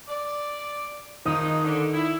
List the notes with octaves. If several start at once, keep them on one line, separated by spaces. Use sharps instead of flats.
D5
D#3 F3 G#3 D#4 D#6
D3
E4